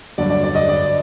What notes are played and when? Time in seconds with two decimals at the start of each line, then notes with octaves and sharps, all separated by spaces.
0.18 G2 D3 F#3 D5
0.30 D5
0.43 D5
0.55 D#5
0.69 D5